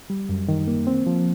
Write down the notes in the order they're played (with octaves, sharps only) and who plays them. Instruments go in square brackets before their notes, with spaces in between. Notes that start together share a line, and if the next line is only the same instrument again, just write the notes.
[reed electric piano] G3
F#2
D#3
A#3
C4
F3